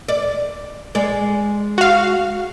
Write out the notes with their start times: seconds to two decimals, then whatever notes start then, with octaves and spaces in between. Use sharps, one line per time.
0.08 D5
0.95 G#3 D5
1.78 F#4 F5